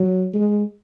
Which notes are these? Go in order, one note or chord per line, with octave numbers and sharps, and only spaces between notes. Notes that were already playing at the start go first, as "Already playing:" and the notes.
Already playing: F#3
G#3